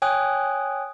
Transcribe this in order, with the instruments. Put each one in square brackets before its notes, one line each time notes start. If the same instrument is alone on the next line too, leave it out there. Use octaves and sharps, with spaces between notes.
[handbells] C#5 G5 G#5 D#6 F#6